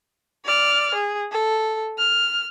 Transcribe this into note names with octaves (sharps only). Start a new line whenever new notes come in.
D5 F6
G#4
A4
F6